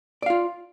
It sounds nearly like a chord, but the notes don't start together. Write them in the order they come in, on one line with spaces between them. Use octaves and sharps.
D5 F5 F4